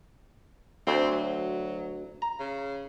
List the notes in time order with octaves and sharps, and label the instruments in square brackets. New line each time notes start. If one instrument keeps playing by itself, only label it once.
[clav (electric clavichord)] D2 [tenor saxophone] C4
[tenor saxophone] F#3
[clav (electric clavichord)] A#5
[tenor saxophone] C#3